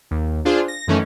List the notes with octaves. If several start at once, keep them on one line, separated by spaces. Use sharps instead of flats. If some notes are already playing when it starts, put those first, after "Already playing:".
D#2
D4 F4 G#4 C5
A#6
F#2 D#3 E3 A3 C#4